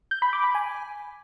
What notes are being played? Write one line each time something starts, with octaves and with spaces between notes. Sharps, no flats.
G6
B5
D6
B5
G#5